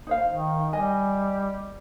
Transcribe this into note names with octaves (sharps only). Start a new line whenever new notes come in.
D#4 C5 F5
D#3
G3 D#5 G#5